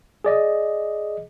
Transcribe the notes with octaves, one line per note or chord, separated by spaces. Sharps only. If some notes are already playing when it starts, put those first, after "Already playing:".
G#4 D5 D#5